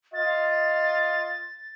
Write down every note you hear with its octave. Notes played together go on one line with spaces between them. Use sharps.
F4 D#5 A6